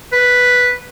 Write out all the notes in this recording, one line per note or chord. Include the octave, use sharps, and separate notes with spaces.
B4